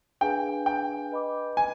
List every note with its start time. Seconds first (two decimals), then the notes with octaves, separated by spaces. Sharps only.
0.21 D4 G#4 B4 F5 G5 G#5
0.66 G5
1.12 B4 D#5 B5 D6
1.57 G#5